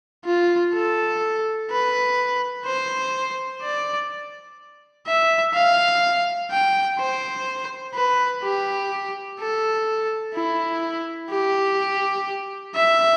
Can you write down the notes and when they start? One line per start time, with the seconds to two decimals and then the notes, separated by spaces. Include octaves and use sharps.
0.25 F4
0.74 A4
1.71 B4
2.66 C5
3.62 D5
5.07 E5
5.54 F5
6.51 G5
6.99 C5
7.94 B4
8.43 G4
9.40 A4
10.35 E4
11.31 G4
12.76 E5